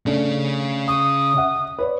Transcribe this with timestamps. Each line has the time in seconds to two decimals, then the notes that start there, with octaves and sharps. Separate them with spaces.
0.06 C#3 A3 C#4 D4
0.88 C#6 D#6
1.37 E5 F#5
1.79 B4 C#5 D5